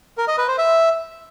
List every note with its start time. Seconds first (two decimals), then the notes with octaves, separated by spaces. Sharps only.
0.18 A#4
0.28 D#5
0.38 B4
0.48 C5
0.58 E5